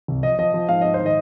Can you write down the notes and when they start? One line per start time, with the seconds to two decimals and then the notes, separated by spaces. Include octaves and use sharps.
0.08 C2
0.23 F3 D#5
0.39 F3 D#5
0.54 F3
0.69 G#2 F5
0.81 G#2 D#5
0.94 C5
0.99 D#3
1.06 D#5